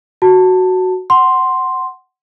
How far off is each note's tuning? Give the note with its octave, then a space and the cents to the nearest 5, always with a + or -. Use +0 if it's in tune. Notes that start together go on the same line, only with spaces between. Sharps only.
F#4 +0 A5 +15
F#5 +15 C6 +0